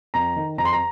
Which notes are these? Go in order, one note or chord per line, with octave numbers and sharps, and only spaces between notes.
F2 A#5
D#3
F2 A#5
C6
A#5